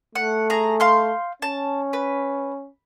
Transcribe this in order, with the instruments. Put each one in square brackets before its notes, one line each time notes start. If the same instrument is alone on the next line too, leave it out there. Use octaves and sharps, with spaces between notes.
[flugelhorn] A3 [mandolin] F#5
[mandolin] G#4 A#5
F5 C6 G6
[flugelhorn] C#4 [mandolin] A5
[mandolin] B4